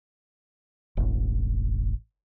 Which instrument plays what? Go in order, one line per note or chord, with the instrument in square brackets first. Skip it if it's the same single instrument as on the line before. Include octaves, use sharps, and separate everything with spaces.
[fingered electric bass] E1 A1